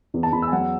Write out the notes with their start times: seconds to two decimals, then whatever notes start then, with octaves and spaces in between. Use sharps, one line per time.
0.14 E2
0.23 A5
0.32 E2 B5
0.42 E6
0.47 G#5
0.52 F#3 F#5